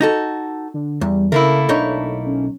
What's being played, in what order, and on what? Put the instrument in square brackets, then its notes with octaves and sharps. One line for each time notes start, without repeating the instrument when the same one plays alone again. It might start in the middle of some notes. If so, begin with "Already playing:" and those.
[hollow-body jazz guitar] D#4 F#4 A4
[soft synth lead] D3
[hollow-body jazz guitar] E2 [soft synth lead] G3
[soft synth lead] C#3 [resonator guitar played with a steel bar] A3 A#3 E4 [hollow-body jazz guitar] A#4
[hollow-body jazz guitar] B1 D#4 C#5 [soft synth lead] D4
[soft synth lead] C#4